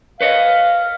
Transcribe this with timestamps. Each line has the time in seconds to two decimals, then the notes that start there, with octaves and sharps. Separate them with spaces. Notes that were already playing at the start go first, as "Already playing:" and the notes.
0.21 B4 C#5 D#5 F5